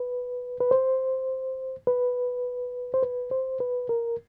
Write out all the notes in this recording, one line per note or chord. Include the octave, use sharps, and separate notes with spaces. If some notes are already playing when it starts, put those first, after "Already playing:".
Already playing: B4
B4
C5
B4
C5
B4
C5
B4
A#4